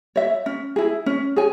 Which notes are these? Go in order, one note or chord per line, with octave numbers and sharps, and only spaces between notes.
C#5 E5
C#4
E4 G#4
C#4
G#4 C#5 G#5